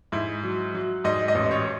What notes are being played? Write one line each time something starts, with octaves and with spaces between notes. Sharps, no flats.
G#2 E4
F#3
F#3
G#2 D#5
D#5
A1
C#5